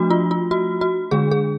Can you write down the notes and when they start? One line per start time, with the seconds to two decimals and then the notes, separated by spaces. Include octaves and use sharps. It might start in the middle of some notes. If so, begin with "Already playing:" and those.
Already playing: F3 A3 D4 F#4
0.10 F4
0.31 F4
0.51 F#4
0.81 F#4
1.11 D3 G#3 D4 G#4
1.31 G#4